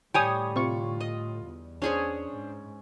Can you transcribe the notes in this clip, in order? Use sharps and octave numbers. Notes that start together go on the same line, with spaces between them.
A2 D3 G3 C#5 G5 G#5 D#6
C3 F4 C#6
D#5
E2
C#4 D4 G#4 C5 C#5
G#2